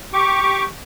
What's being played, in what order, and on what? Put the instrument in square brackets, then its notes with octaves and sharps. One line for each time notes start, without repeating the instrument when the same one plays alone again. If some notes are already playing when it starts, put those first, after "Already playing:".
[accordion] G4 C#6 D6